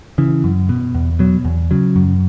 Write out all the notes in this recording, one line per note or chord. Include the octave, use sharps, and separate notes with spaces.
C#3 E3
F#2
B2
E2
B2 F#3
E2
C#3 F#3
F#2